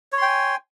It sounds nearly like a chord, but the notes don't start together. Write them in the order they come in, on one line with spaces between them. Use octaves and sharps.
C#5 C6 G5 G#5